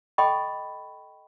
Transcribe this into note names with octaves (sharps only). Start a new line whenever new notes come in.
A4 D#5 G5 B5 C#6